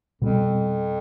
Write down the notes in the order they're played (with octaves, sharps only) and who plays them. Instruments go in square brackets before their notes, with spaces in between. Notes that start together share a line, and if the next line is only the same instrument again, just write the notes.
[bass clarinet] F2 [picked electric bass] B2 G3 C4